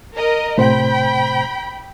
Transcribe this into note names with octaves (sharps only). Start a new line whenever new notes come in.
A#4 D#5
A2 C3 C5 G5 B5